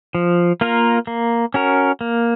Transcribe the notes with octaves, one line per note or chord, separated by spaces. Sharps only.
F3
A#3 F4 A#4
A#3
C#4 F#4 A#4
A#3